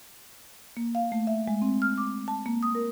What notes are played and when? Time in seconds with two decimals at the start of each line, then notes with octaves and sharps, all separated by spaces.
0.77 A#3
0.95 F5
1.12 A3
1.27 E5
1.48 G#3
1.62 C4
1.82 F6
1.98 D6
2.28 A5
2.46 A#3
2.63 D#6
2.75 A#4